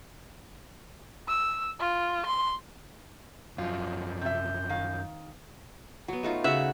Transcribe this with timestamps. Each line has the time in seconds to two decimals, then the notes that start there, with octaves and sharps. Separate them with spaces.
1.28 E6
1.79 F4
2.25 C6
3.58 F#2 F3 F4
4.21 C3 E5 G6
4.69 D#3 F5
6.08 F#3 B3
6.23 A3 D#4 F4
6.44 C#3 F#4 E5 F#5